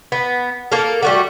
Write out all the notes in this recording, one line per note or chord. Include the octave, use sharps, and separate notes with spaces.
B3
A#3 A4 A#4
G3 A3 F#4